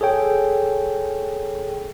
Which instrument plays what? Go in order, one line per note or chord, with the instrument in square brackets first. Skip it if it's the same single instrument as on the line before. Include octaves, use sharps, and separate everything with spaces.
[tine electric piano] G#4 A4 C#5 G5